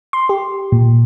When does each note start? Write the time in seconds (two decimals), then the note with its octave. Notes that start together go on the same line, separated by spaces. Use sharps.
0.13 C6
0.29 G4
0.72 A#2